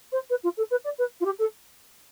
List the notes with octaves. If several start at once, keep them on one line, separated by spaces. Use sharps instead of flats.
C5
B4
F4
A4
B4
D5
B4
F4
G4
A4